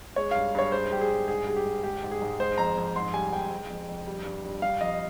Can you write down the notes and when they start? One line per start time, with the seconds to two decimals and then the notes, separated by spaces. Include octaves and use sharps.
0.16 G#3 C#5
0.31 G2 F5
0.55 G2 C#5
0.72 G#3 C5
0.91 G2 G4
1.01 G#4
1.10 G2
1.28 G#2 G#4
1.47 G3 G#4
1.56 G4
1.65 G#2
1.84 G#3 G4
2.03 G#2
2.11 G#4
2.22 G#2
2.39 G#3 C5
2.58 F2 A#5
2.77 F2
2.96 G#2 C6
3.14 G3 G#5
3.32 G#2 G5
3.51 G#3
3.70 F2
3.89 F2
4.07 G3
4.25 G2
4.44 G2
4.62 G3 F5
4.81 F2 D#5